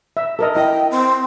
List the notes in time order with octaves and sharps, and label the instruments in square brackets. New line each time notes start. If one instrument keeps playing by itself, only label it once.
[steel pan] E5
A4 A#4 D#5
[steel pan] E4 D#5 [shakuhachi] G5
[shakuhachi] C4